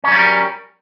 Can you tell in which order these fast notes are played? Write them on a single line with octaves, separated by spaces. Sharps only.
C#4 F#3 G3 A#4